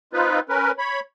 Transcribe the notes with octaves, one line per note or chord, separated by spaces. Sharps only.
C4 D#4 F4 B4
C#4 A#4 B4
C#5 B5